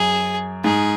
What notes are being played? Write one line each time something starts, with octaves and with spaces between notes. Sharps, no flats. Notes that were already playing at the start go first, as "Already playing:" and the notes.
Already playing: F#2 G#4
G#2 G#4